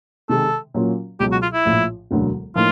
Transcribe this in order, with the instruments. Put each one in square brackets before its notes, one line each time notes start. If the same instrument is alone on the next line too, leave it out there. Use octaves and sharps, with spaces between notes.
[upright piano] C3 D#3 G#3 [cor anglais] A4
[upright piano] A#2 F#3 A#3 C#4 F4
[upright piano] C#2 B2 F#3 [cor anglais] G4
[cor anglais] F#4
F4
E4
[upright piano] A#1 A2 F3
E1 D2 D3 F#3 A#3
[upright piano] A2 F3 A#3 D#4 [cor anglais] F4